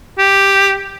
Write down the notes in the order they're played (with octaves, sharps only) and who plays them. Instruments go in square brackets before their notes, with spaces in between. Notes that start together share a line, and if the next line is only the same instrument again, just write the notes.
[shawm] G4